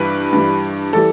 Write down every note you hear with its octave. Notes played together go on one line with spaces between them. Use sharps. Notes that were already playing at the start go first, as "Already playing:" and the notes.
Already playing: G2 E3 G3 B4
G2 E3 G3
E3 G3 A4